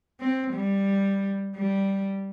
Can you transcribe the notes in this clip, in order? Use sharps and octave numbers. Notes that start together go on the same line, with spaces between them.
C4
G3
G3